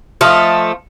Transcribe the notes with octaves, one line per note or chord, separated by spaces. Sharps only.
F3 A3 D#5 F5